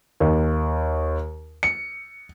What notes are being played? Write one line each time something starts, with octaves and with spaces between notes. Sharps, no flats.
D#2
C#7